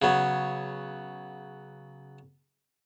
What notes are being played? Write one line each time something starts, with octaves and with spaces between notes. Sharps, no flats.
C#3 F#3 B3